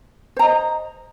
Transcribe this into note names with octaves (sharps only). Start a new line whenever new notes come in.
C5 D#5 A#5